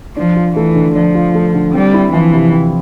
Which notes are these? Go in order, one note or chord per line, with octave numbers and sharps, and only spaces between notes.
F3 D4
F4
E3 A3
D3
F3 D4
F4
A3
D3
G3 C4
E4
E3 F3
C3
C4